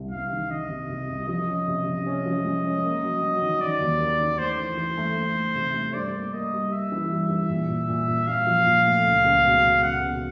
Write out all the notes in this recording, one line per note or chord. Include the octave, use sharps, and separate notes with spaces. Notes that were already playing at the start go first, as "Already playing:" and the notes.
Already playing: C2 C3
C2 F5
D#3
D#3 D#5
C3
C3
C2
F3 D#5
C#4
C3
C3
C#4
F3
G#3
C#4
A#3
F#3
F#3
D#3
D#3 D5
D#2
A#3
D#3
A3 C5
E3
E3
A3
A3
A3
C3
A3
G2 D5
A#3
A#3 D#5
G3
A#3 E5
E3
G3
E3
A#2
A#2
A#2
A#2
A#2 F5
F3
A#2
A3
C#2
C#2
B2
B2
C#2 F#5
B2